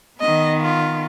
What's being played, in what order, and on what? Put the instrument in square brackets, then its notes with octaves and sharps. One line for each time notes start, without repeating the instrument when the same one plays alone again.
[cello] D#3 B3 [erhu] D#5
[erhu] F4